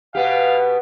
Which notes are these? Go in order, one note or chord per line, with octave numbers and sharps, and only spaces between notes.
B2 B3 G4 F5 F#5